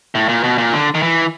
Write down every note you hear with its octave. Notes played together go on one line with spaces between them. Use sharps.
A2
A#2
B2
A#2
D3
D#3
E3